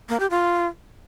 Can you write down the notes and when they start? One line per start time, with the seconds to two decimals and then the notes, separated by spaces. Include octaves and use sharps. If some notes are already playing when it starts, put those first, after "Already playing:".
0.09 A#3
0.20 G4
0.31 F4